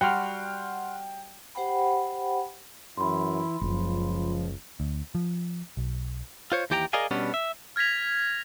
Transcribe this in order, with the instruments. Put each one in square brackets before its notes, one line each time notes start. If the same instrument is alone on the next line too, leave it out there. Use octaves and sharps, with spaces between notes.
[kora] G3 F#4 [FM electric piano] F#5 C6 F6 [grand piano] G5
[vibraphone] G4 C5 F#5 G5 B5
[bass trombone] F#2 [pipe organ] E3 E4 [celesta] B5 C6
[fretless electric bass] F#1 [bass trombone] C#2 [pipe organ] F3
[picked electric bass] D2
F3
B1
[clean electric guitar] F4 C5 C#5
D#2 E3 G4 G5 A5 A#5
G#4 A#4 D5 D#5 F5 G#5
B2 G3 B3 C#4 D4
E5
[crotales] F6 G#6 A#6 B6 F7